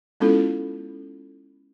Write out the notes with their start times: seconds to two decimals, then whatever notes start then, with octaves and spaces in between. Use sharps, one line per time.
0.20 G#3 B3 C#4 E4 F4 A4